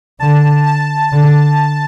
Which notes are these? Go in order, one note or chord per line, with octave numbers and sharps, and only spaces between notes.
D3 A5
A5
D3